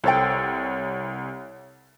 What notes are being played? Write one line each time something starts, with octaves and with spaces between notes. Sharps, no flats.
C2 A4 C5 C#5 G5 A6